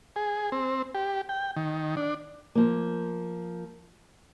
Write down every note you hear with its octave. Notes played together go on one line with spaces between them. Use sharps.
G#4
C4
G4
G5
D#3
D4
F3 A#3